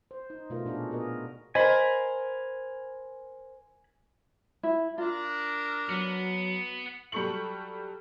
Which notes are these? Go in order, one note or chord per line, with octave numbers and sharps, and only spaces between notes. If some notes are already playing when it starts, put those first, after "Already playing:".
C5
D#4
B2 A3 F4 A#4
A#2 D4 F#4 G#4
B3 G#4 A#4 D#5
A#4 C5 D#5 G#5 B5
E4
D4 F4 A#4
F#3 B3
F#3 G3 A4 C#6 C#7 F#7